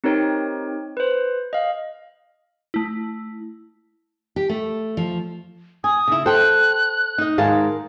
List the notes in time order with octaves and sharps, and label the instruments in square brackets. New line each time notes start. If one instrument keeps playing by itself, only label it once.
[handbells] C4 D#4 G4 A#4 C#5 G5
B4 C5
D#5 F5
[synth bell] A3 E4
[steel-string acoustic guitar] G4
A3
F3
[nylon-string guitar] G#5 [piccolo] D#6
[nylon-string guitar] C#3 E4
[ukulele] A4 [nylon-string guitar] C5 G5 [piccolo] F#6
[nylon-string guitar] D#4 D#5
[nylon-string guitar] G#2 D#3 A5 [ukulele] G#4 A#4 F5